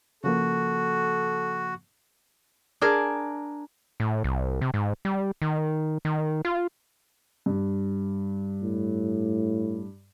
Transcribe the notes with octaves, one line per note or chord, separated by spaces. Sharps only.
C#3 F3 A#3 F#4 A4
D4 G#4 A#4
A2
C2
C3
G#2
G3
D#3
D#3
F4
G2
A2